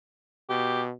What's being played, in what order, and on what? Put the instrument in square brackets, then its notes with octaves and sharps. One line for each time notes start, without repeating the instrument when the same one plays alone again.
[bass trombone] B2 [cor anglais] G4